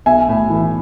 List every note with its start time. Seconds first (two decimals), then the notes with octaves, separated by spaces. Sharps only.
0.06 B1 E5 G#5
0.28 A2
0.50 E3